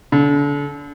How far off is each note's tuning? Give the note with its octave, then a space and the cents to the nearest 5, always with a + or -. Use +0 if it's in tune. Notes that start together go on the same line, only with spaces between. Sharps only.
D3 -35